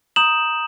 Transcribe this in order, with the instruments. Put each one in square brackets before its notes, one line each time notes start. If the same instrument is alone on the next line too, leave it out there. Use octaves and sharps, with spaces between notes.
[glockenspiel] A#5 D#6 G6 E7 F#7